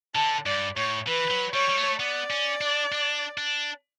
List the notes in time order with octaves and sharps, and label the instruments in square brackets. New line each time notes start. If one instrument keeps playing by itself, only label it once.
[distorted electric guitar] D3 [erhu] A5
[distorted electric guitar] G2 [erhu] D5
[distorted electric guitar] A2 [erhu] C#5
[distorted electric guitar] E3 [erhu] B4
[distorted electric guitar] F#3
[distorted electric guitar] G3 [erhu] C#5
[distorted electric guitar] G3
A3
[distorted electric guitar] B3 [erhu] D5
[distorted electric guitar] C#4
D4
D4
D4